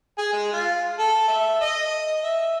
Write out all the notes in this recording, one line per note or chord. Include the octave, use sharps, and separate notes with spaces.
G#4
G#3
F4
A4
E5
D#5
E5